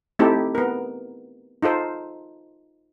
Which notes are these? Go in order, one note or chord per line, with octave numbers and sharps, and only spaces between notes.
A3 C4 D#4 E4 G4 A4
B3 A#4
D#4 F4 A4 C5